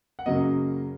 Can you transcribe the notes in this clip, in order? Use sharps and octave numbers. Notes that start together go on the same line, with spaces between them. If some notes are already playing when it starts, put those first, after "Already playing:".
F#5
F#2 C#3 F#3 A#3 D#5